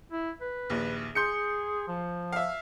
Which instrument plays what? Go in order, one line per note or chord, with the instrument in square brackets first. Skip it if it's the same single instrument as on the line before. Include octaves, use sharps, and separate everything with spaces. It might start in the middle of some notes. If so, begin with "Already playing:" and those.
[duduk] E4
B4
[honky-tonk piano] A#1 D#2
[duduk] G#4 [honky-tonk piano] C6 G6 C#7
[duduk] F3
[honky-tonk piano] E5 F5